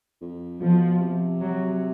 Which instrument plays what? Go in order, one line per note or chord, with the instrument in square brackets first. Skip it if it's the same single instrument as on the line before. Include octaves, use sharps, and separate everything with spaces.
[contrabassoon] F2
[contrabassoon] B2 [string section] F3
[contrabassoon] C3
[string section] F#3